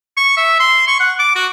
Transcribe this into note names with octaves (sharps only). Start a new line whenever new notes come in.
C#6
E5
C6
C#6
F#5
D6
F#4